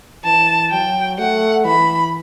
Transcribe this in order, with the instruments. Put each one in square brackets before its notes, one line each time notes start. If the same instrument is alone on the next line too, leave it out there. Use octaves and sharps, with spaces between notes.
[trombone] E3 [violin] A5
[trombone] F#3 [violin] G5
[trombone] A3 [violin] F#5
[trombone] E3 [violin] B5